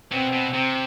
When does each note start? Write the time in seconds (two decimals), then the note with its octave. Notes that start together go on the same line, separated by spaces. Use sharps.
0.12 B2 C4
0.33 B2
0.54 C3 C4